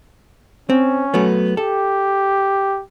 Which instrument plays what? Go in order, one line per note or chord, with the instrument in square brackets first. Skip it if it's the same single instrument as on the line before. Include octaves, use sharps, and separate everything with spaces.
[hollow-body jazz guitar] C4 [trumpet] C#4
[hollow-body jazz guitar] F#3 A3 B3
[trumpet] G4 [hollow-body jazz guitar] A4